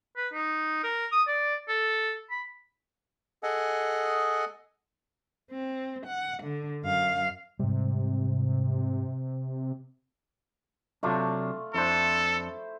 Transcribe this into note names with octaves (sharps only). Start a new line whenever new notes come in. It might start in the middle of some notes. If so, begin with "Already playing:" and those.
B4
D#4
A#4
D#6
D5
A4
B5
G#4 A4 D#5 F#5 G#5
C4
F#5
D3
F#2 F5
G#2 C3 G3
C3 F#3 A3 D4 F4
F2 D4 E4 A4 C5